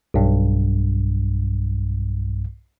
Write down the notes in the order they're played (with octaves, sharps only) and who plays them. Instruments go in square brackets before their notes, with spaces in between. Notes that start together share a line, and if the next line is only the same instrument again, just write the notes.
[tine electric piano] B1 G2